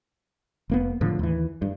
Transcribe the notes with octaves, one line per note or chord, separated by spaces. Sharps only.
F1 A#3 B3
A2 D3 F3
D#2 E3
G2